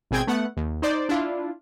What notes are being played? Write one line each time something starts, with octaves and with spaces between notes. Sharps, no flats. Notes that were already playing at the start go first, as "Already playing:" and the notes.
G#1 B2 C4 G#4 G5 G#6
A3 B3 F#5
D#2
D#4 C5 D5
D4 E4 F4